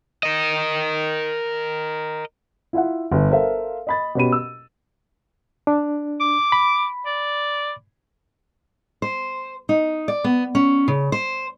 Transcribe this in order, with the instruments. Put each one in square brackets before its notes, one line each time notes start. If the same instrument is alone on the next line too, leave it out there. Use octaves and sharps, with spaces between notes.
[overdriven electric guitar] A#4 D#5
[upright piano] E4 F4 E5 F#5
G1
A4 A#4 C5 E5 F5
D#5 B5 A6
B2 C#4 G4 B5 D#7
E6
[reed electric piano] D4
[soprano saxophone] D6
[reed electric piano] B5
[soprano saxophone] D5
[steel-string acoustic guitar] C5
D#4
D5
B3
C#4
C#3
C5